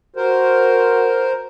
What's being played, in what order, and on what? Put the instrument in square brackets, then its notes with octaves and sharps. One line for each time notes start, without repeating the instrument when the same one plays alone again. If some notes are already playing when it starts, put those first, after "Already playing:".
[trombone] F#4 [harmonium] A#4 C5